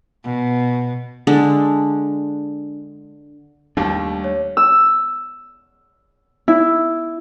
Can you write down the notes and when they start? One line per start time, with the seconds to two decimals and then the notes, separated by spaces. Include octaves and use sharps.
0.24 B2
1.27 D3 G#3 D4
3.77 D#2 G3 A3 D4 E4 F4 G4 A5
4.24 C#5
4.57 E6
6.48 E4